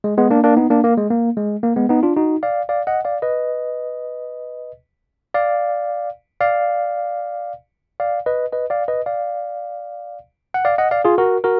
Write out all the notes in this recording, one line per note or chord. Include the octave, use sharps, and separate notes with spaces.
G#3
G#3 B3
A#3 D4
A#3 D4
B3 D#4
A#3 D4
A#3
G#3
A#3
G#3
A#3
G#3 B3
B3 D#4
D4 F4
D#4 F#4
D5 F5
D5 F5
D#5 F#5
D5 F5
B4 D#5
D5 F5
D5 F5
D5 F5
B4 D#5
B4 D#5
D5 F5
B4 D#5
D5 F5
F#5
D5 F5
D#5 F#5
D5 F5
F4 G#4
F#4 A#4
F#4 A#4